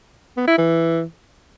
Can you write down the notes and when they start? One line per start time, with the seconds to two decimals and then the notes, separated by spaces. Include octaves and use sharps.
0.37 B3
0.48 E4
0.58 E3